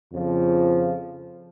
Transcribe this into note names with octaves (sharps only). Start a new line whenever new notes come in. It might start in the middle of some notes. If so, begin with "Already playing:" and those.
F2 C#3 F3